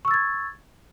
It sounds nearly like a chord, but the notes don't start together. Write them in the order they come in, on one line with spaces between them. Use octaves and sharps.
C#6 E6 A6 G#6